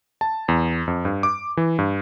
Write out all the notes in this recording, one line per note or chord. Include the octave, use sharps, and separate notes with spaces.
A5
E2
F2
G2
D6
E3
G2